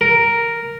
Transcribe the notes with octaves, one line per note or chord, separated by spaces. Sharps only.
A#4